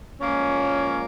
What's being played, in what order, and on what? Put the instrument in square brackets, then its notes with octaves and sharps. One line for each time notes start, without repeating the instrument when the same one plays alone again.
[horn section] A#2 F3 G#3 A#3 C#4